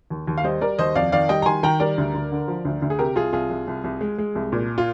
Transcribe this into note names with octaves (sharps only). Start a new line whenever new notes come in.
D#2
D#2
F5
G3 C5 D#5
G3 A#4 D5
D#2 C5 D#5
F2 D5 F5
D#3 D5 F5
G3 D#5 G5
A#5
D#3 G#5 C6
D#3 G5 A#5
G3 A#4 D5
D2
D2
D3
F3
D2
D2
G#4
C3 G4 A#4
C2 F4 G#4
C2 F4 G#4
C2
C2
C2
G#3
G#3
C2
A#2
F4